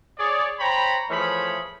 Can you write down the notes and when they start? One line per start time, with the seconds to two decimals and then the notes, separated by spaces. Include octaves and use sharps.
0.18 G#4 C#5 D5
0.60 C5 C#5 G5 A#5 B5
1.10 E3 F3 A3 G#4 C#5 B5